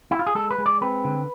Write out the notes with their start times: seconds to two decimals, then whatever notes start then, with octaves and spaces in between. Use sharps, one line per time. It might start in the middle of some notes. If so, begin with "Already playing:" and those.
0.11 E4
0.19 F4
0.27 G#4
0.35 G#3 A4
0.51 B4
0.58 G#3
0.66 D5
0.81 C4 B4
1.05 D3